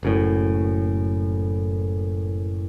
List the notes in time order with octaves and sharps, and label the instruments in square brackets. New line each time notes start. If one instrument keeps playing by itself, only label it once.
[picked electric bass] F#1 F#2 A2